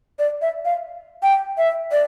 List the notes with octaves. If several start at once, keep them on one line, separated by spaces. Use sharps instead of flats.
D5
E5
F5
G5
E5
D5